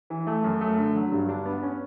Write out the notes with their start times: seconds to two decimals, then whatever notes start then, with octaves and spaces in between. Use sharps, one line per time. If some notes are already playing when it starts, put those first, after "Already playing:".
0.10 E3
0.27 A3
0.44 F#2
0.61 A3
0.78 D3
0.95 F#3
1.12 G2
1.29 D4
1.46 B3
1.63 C#4